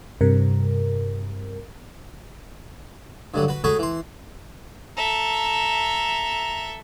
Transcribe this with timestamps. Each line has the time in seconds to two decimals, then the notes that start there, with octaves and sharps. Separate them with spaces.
0.21 G2 C3 A#4
3.34 G2 D3 F#3
3.48 F#4 B4
3.64 F#4 G#4 A4 C#5 G#5 B5
3.79 E3 C6
4.97 A4 E5 A#5